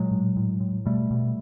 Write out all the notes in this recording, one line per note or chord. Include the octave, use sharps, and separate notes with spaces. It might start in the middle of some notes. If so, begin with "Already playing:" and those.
Already playing: A#2 F#3 G#3
A2
A2
A2
B2 G3 A3
B2